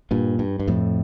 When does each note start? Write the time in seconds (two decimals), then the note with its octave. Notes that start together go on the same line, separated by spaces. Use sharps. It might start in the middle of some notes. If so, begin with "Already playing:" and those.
0.11 G2 A#2
0.39 G2
0.60 G2
0.68 F2 A2